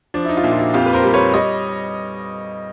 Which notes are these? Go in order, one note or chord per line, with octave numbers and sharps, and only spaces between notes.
F3 D4
E4
D#4
F4
A#2 D4 E4
F4
E4 F#4
F2 F4 G4
B4
A#4 C5
G3
B4 C#5
G3 C#5 D#5